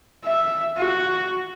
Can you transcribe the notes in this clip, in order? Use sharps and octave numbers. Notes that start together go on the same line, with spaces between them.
E5
F#4